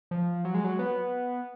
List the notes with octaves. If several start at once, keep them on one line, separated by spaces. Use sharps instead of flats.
F3
F#3
G#3
F#3
B3